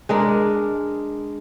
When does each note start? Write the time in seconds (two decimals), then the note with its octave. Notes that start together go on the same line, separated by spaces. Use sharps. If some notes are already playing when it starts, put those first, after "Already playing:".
0.09 G#3 D4 A#4